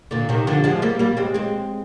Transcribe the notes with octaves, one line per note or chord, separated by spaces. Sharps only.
A#2 D3
C3 D#3
D3 F3
F3 G#3
G3 A#3
G3 A#3
G#3 C4
G#3 C4